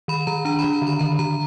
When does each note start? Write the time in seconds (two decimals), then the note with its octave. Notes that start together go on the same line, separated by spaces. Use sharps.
0.08 D#3 B5
0.27 D#3 A#5
0.45 D4 A#5
0.59 B5
0.64 D#3
0.73 A#5
0.82 D3
0.87 B5
0.99 D3 A#5
1.19 D3 A#5